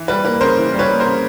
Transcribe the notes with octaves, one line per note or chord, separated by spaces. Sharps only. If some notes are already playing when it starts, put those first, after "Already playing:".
Already playing: E3
G3 B4
A#3 B4
C#3 A#4 C5
E3
G3
B4 C#5
A#3
A#4 C5
C#3